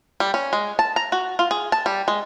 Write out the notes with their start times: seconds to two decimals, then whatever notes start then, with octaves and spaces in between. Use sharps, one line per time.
0.20 G3
0.34 C#4
0.53 G#3
0.79 A5
0.96 A#5
1.12 F#4
1.39 F4
1.51 G#4
1.72 A5
1.86 G3
2.08 G#3